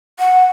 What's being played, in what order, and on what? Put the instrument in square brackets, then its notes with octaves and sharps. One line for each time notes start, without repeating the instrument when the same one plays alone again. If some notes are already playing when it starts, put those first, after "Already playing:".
[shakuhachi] F#5